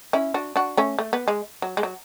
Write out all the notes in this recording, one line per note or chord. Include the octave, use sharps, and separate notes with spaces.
C#4 E4
D4 F#4
D4 F#4
A3 C#4
A3
B3
G#3
F#3
G#3
F#3